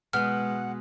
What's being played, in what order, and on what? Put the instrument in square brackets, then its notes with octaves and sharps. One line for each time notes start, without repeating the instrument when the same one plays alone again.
[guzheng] B2 B3 [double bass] G#3 [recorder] F#5 [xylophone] F6